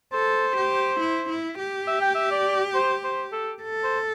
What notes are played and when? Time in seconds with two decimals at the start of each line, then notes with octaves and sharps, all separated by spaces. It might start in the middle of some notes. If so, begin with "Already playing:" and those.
0.13 A4 C5
0.57 G4
1.01 E4
1.30 E4
1.58 G4
1.87 E5
2.02 G5
2.15 E5
2.31 D5
2.75 C5
3.04 C5
3.33 A4
3.62 A4
3.84 C5